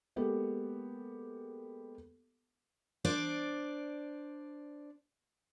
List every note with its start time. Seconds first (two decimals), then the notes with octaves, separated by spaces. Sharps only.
0.16 G#3 A#3 B3 G4 A4
3.05 D4 C5 D5